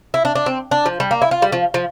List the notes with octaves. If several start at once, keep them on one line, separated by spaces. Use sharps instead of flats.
E4
D4
D4
C4
D4
F3
G3
A#3
E4
F4
G3
F3
F3